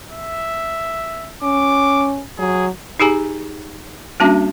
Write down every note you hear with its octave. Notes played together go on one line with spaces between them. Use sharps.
E5
C#4 D6
F#3 G#4
D#4 G4 G#4 G#5 A#5
G3 A#3 C#4 D4 F#4